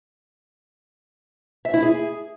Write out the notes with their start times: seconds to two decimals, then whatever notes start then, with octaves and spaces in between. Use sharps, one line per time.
1.65 E5
1.74 E4
1.82 G#4